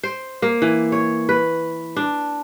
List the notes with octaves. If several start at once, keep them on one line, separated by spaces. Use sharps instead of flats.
C5
A#3
E3
C#5
B4
D4